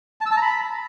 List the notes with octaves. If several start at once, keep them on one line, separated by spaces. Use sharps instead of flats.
A5
E6
A5
A#5
B5